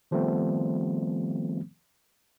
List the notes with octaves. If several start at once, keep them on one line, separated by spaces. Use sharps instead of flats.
D#3 F3 G3 A3 B3 C4